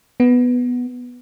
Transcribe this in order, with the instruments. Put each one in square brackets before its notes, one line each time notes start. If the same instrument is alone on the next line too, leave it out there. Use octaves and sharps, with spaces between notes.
[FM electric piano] B3